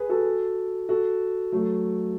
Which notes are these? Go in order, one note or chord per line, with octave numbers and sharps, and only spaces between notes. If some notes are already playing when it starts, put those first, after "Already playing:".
Already playing: G#4 B4
F#4 A4
F#4 A4
F#3 A3